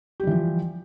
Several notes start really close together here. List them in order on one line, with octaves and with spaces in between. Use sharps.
G4 G3 E3 F3